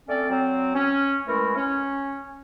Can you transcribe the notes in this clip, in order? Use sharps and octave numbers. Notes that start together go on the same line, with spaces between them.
A3 C4 C#4 D5
F#3 C4
C#4
E3 G#3 A3 E4 A#4
C#4